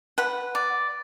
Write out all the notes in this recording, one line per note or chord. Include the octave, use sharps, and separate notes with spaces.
B4 F#5
D5